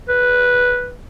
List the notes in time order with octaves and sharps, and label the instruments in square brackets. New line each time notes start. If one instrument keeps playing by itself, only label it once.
[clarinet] B4